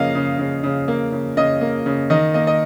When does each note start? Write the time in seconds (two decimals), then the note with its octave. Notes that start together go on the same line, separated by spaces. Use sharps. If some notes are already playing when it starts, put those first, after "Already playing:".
Already playing: C#3 F3 A#3 D#5 F5
0.15 C#3
0.39 C#3
0.64 C#3
0.88 A#3
1.12 C#3
1.37 C#3 D#5
1.61 A#3
1.86 C#3
2.10 D#3 D#5
2.34 A#3 D#5
2.47 D#5